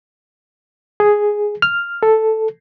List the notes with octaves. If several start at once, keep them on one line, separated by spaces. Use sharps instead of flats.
G#4
F6
A4